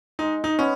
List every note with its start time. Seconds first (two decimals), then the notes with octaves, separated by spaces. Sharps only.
0.19 G#3 D#4
0.44 D#4
0.59 B3 C#4